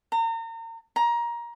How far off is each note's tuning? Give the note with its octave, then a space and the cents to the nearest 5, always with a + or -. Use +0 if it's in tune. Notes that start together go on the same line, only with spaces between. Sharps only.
A#5 -35
A#5 +20